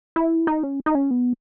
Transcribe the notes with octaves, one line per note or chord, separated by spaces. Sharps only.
E4
D#4
C#4
D#4
C#4
B3